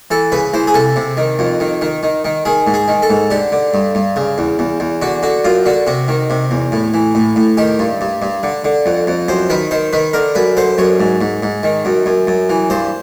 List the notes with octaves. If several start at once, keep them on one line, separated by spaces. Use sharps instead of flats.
E3 A4
C#3 B4
E3 C5
G#4
C3 A4
C3
D#3
F2
D#3
D#3
D#3
D#3
D#3 G#4
G#2
G#4
D#3
A4
G#2
D3 G4
D3
G2
G2
C#3
E2
E2
E2
D3 F#4
D3 F#4
F#2 F4
D3 F#4
C3 F#4
D#3
C3
E2
A2
E3
A2
A2
D#3 G4
G2
G2
G2
D3
D3
F2
F2
F#2 C5
D#3 B4
D#3 C5
D#3 B4
D3 A#4
F#2 B4
D3 C5
F#2 C#5
G#2
G#2
G#2
D#3
F#2
F#2
F#2
E3
G2 C5